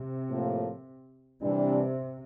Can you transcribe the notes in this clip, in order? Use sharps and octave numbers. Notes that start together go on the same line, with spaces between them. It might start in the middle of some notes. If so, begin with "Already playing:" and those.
Already playing: C3
A2 F3 A#3
C3 E3 G3 D4